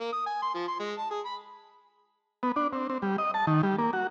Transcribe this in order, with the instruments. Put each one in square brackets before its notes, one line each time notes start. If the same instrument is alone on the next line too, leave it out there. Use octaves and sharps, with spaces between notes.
[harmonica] A#3
D#6
G#5
C6
F3
C6
G#3
A5
G#4
B5
[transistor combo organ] B3
D4
C4
C4
G3
D#5
A5
D#3
G3
A#3
F#4